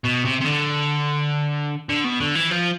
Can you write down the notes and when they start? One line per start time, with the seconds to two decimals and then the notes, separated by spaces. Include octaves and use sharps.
0.04 B2
0.25 C3
0.41 C3
0.45 D3
1.89 D3
2.04 B2
2.20 D3
2.35 E3
2.51 F3